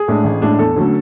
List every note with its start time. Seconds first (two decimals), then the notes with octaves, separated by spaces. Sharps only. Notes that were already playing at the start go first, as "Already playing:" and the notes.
Already playing: G#4
0.08 A2 G#3 D4
0.24 A1
0.42 A2 G#3 D4
0.59 E2 A4
0.76 D3 F#3 A3 C#4